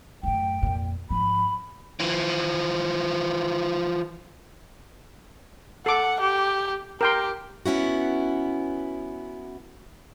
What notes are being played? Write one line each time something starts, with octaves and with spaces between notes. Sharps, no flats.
F#2 A2 G5
F2 A#2
G#2 F3 B5
E3 F3
A4 F#5 D6
G4
G4 A#4 G5 C6
B3 C#4 E4 F#4